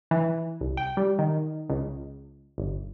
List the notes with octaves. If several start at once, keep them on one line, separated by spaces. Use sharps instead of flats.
E3
C2
G5
G3
D#3
C#2
G1